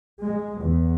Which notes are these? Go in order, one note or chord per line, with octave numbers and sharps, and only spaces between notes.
G#3
E2